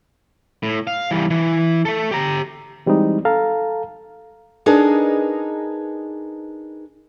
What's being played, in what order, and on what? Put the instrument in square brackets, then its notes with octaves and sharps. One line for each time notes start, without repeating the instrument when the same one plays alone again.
[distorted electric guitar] A2
F5
E3 G3
E3
A3 A4
G4 A#5
[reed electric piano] E3 G3 G#3 C4 D#4
A4 F5 A5 A#5
[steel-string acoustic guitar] D4 D#4 G#4 A#4 B4 D#5